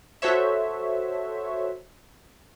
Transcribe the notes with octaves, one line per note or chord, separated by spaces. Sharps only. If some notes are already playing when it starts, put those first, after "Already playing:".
F#4 A4 C5 C#5 E5